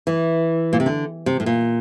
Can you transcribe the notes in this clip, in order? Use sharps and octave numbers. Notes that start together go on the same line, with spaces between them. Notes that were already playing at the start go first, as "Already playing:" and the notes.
E3
A#2
C3
D3
C3
A2
A#2